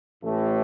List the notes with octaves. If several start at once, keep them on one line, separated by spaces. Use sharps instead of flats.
A1 A2 E3 A3